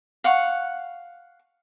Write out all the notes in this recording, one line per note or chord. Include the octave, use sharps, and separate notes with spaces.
F5 F#5 C#6